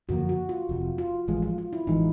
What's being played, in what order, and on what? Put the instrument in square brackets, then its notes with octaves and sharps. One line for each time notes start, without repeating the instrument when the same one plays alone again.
[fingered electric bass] F#2 D3 F3 A#3 [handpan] F#4
[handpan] F#4
F4
[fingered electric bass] F1 F2 C3
[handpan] F4
[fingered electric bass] A1 A2 F3 G#3
[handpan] F4
F4
E4
[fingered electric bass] A1 E3 G#3 [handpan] D#4